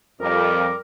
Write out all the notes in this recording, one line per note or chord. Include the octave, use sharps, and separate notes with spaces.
F2 G3 A#4 D6